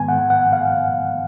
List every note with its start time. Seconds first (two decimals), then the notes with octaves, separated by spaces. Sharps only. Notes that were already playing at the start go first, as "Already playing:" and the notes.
Already playing: G#2 D#3 G#3 B3 G#5
0.08 F#5
0.30 F#5
0.52 F5